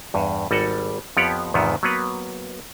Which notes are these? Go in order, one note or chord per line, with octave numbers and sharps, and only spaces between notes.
E2 G2
G#1 G3 A4 D#5 F#5 G#5
F2 F3 B3 G4 C#5 F#5
E2 G#2 C3 D#3 F3 B3
F#3 A#3 B3 B4